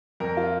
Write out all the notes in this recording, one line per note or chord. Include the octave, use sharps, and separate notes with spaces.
F2 A#4
F4